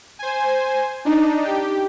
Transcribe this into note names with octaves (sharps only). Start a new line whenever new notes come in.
C5 G#5
D4 D#4
G4